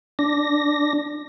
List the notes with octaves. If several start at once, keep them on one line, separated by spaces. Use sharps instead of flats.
D4 A#6